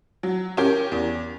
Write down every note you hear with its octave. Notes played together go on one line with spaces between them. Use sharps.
F#3
C#4 G4 A#4
E2